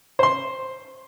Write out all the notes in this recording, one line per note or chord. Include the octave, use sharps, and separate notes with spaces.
C5 C6